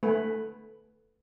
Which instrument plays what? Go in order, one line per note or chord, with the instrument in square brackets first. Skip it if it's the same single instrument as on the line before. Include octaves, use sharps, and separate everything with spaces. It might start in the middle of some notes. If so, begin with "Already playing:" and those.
[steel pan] A3 B4